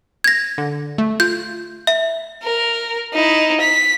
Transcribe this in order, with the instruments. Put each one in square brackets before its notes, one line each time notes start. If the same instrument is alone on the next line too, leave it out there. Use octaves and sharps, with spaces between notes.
[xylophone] G#6 A#6
[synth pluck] D3
A3
[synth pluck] F4 [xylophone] G6
[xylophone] E5
[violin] A#4
D#4 E4
B6